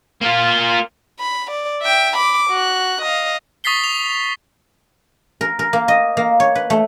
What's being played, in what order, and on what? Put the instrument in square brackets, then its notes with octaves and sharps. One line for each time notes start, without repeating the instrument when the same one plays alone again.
[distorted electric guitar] A#3 F4
[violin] B5
D5
E5 G5
B5 D6
F#4 F#6
D#5 F5
[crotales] C#6 D#6 A6 B6 C7 G7
F7
[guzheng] A#4
A#4
A#3
D#5
A#3
C#5
B4
A3